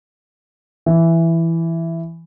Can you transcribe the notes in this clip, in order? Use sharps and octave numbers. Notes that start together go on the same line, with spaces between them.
E3